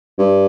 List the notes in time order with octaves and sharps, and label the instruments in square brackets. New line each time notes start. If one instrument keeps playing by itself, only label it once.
[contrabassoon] G2